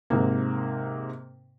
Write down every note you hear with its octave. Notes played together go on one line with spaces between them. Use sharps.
G#2 C3 A#3